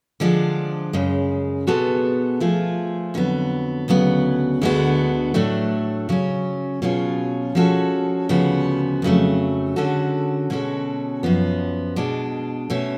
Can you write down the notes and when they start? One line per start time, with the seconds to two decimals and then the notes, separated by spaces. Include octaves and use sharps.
0.20 D3 F3 G#3 D4
0.93 F#2 C#3 G#3
1.67 B2 G#3 B3 F#4 A4
2.40 F3 A3 F4 G#4
3.14 F2 D3 F#3 B3
3.88 D2 C#3 F#3 B3
4.62 D2 D3 G#3 B3 F#4
5.34 A2 F#3 A3 D4
6.09 C#3 F#3 C#4
6.82 B2 F#3 C#4 F4 G#4
7.55 F3 G#3 C#4 F#4 A4
8.29 D2 C#3 F3 B3 F#4
9.02 F2 C#3 F#3 A3
9.76 D3 G#3 C#4 F#4 A4
10.50 B2 G#3 C#4 F#4 A4
11.23 F#2 F3 B3
11.96 B2 G#3 D4
12.70 B2 A3 C#4